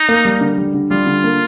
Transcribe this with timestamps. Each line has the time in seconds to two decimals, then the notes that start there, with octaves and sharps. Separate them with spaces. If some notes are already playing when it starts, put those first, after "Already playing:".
Already playing: D#4
0.09 A#3
0.25 G3
0.41 D3
0.58 G3
0.74 D3
0.91 G3 F4
1.07 D3
1.24 A#3